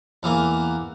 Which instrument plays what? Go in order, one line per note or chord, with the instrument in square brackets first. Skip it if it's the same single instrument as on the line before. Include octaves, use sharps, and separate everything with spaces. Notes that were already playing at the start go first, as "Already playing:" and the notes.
[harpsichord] E2 E3 A#3